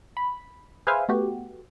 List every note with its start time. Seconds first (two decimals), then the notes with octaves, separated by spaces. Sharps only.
0.17 B5
0.87 G#4 B4 C5 E5 F5 G#5
1.09 A3 B3 F#4 G4